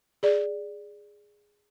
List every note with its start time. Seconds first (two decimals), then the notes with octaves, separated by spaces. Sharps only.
0.23 G#4 D5